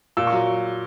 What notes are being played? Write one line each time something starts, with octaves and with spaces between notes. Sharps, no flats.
A#2 E6
C#6
F#3